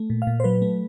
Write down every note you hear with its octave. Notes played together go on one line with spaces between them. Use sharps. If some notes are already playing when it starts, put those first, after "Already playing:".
Already playing: A3
A#2
F5
A#2
C5
F#3 B4
A3